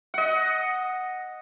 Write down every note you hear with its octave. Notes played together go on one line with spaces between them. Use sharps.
D#5 F#5